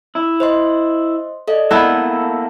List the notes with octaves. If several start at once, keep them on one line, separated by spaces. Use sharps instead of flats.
E4
C5 D#5 C6
A4 D5 D#5
A#3 B3 E4 A4 A#6